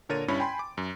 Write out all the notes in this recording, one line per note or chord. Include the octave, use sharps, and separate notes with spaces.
A#2 D3 A#4 C#5 A6 D#7
G2 C#4 E4 C#5 B5
G5 G#5 B5 C6
D6
F#2